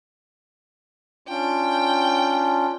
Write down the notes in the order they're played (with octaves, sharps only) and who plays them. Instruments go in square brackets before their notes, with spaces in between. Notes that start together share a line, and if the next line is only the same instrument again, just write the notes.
[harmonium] C#4 D4 F4 [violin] G5